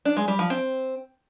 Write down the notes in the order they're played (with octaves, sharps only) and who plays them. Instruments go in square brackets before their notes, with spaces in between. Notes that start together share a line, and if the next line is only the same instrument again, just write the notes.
[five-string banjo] D4
G#3
G3
F3
C4